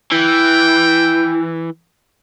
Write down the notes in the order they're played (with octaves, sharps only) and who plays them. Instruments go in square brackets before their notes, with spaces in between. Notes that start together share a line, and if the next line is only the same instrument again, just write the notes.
[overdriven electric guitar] E3 [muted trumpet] G5